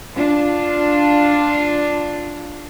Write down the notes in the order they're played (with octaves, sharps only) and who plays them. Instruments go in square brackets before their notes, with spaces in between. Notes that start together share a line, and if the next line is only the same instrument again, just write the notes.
[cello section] D4 F4